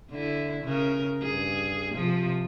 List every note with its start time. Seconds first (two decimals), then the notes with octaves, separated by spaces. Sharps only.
0.11 D3 E4
0.64 C#3 A#4
1.22 G2 G#4
1.95 C3 F3